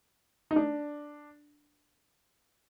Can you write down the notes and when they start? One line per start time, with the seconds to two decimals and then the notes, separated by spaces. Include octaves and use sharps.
0.51 D#4
0.56 D4